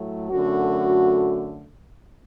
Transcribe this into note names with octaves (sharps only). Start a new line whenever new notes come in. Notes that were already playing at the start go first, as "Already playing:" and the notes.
Already playing: A2 F#3 A3
F#2 D3 A3 F#4